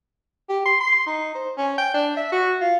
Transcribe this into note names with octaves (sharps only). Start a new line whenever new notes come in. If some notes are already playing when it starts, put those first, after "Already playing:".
G4
C6
C6
D#4
C5
C#4
G5
D4
E5
F#4
F4